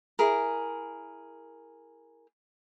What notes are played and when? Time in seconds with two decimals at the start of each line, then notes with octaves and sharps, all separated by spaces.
0.19 E4 G#4 A#4